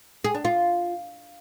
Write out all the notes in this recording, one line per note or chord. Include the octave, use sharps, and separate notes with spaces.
G#4
D4
F4